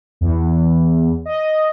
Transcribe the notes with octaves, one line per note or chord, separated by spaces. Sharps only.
E2
D#5